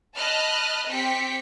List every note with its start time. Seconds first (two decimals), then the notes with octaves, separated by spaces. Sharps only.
0.17 D#5 A5 B5 F6 F#6
0.90 C4 G4 G5 B6 C#7